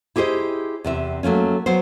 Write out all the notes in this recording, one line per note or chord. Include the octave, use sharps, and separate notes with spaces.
E4 G4 G#4 C5 D#5
E2 C3 E5
F#3 A3 A#3 C#4
F#3 B3 C5